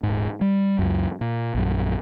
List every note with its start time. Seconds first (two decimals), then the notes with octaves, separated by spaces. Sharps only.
0.03 D#1 G#2
0.41 G3
0.79 C#2 F#2
1.21 A#2
1.55 A#1 F#2